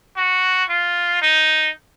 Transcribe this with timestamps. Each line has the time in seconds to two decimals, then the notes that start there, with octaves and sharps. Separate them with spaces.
0.17 F#4
0.69 F4
1.22 D#4